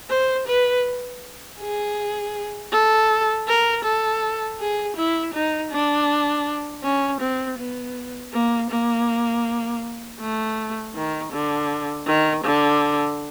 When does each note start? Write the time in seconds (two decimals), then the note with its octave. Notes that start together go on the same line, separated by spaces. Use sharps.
0.10 C5
0.48 B4
1.60 G#4
2.72 A4
3.48 A#4
3.84 A4
4.60 G#4
4.97 E4
5.34 D#4
5.71 D4
6.84 C#4
7.21 C4
7.58 B3
8.33 A#3
8.70 A#3
10.20 A3
10.95 D#3
11.32 D3
12.07 D#3
12.44 D3